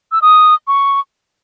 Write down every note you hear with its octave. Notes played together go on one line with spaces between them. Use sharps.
E6
D#6
C#6